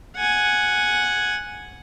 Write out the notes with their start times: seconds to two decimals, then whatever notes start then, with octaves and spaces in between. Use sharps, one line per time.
0.16 F#5 G#5